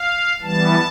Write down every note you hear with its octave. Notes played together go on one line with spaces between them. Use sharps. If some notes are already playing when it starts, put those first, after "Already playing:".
Already playing: F5
E3 G3 B3 A5